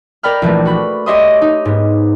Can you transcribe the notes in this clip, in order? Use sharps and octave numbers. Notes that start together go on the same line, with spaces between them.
A#4 D5 G5 B5 F6
A#1 E3 A3
F#4 B5
G4 C#5 D#5 E5 C6 D#6
D#4
G#2 B3